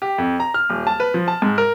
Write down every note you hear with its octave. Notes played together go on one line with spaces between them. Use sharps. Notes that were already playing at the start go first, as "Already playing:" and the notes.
G4
F2
A#5
F6
D#1
A5
B4
F3
A5
G#2
A#4